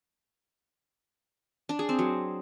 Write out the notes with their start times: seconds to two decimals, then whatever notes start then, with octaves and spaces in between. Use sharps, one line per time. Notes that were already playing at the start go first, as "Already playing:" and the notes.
1.69 D4
1.79 G#4
1.89 C4
1.99 F#3